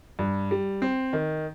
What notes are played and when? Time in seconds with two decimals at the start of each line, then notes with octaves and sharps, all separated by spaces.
0.19 G2
0.51 G3
0.82 C4
1.13 D#3